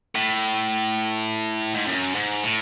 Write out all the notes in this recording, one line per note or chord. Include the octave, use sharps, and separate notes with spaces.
A2
G#2
F#2
G#2
A2